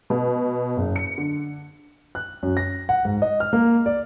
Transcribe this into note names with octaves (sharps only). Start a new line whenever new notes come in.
B2
F#1
C#7
D3
F#6
F#2
A#6
F#5
G#2
D#5
F6
A#3
D5